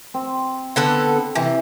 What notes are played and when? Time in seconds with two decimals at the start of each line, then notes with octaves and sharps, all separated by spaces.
0.14 C4
0.76 D3 B3 A4
1.35 C3 E3